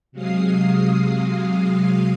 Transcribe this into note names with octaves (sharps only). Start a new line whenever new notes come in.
C3 F#3 G#3 F5 D#6 C7